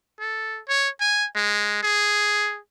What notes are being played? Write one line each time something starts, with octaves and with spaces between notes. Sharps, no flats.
A4
C#5
G#5
G#3
G#4